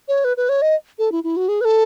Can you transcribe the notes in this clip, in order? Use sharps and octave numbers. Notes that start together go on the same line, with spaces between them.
C#5
B4
B4
C#5
D#5
A4
E4
E4
F#4
G#4
B4
A4